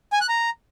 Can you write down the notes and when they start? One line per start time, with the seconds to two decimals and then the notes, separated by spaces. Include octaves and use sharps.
0.13 G#5
0.21 F#6
0.29 A#5